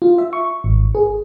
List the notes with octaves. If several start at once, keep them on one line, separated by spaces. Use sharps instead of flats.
F4
E5
C#6
G#1
G#4